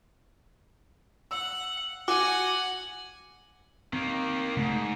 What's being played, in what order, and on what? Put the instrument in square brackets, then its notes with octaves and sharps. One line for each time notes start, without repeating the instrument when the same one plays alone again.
[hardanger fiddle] F#5 [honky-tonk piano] E6
[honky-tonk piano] F#4 [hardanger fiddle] F#5 G#5 [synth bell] D6
[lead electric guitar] D#3 A#3 [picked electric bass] C4
[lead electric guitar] G#2 [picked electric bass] C#3 A3